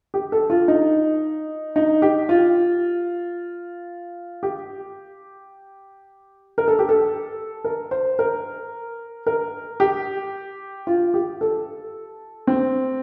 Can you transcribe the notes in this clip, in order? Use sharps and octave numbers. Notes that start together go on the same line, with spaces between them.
G4
A4
F4
D#4
D#4
G4
F4
G4
A#4
A4
G4
A4
A#4
C5
A#4
A#4
G4
F4
G4
A4
C4